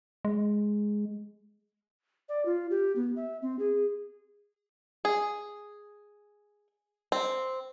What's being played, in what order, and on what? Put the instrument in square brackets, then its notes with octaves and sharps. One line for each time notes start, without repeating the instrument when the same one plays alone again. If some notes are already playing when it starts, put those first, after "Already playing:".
[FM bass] G#3
[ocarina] D5
F4
G4
B3
E5
C4
G#4
[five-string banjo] G#4
C4